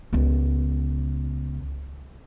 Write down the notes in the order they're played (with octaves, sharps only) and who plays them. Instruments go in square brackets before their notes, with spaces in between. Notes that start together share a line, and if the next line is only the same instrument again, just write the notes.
[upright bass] C#2 B3